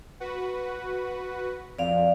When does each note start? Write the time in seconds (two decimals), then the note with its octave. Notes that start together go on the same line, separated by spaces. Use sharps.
0.20 F#4 B4
1.79 F2 D5 F5